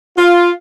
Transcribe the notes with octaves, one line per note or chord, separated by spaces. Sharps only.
F4